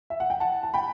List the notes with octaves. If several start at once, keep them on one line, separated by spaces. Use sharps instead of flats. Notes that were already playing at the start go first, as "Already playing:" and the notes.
E5
F#5
G5
F#5 A5
A5
G5 B5